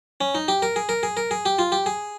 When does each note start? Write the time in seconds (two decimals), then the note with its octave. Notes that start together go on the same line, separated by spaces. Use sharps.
0.21 C#4
0.35 D#4
0.48 G4
0.62 A#4
0.76 G#4
0.89 A#4
1.03 G#4
1.17 A#4
1.31 G#4
1.46 G4
1.59 F4
1.72 G4
1.86 G#4